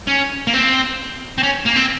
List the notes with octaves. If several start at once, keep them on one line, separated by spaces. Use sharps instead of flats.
C#4
A#3
C4
C4
C#4
A#3
C4